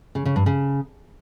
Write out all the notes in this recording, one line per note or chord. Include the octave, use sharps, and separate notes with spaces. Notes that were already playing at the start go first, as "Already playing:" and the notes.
C#3
C#3
G2
C#3